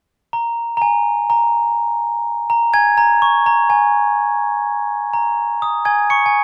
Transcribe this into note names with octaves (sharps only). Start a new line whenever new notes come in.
A#5
A#5
G#5
A#5
A#5
G#5 G#6
A#5
C#6
A#5
G#5
A#5
D#6
G#5 G#6
C#6 C#7
G#5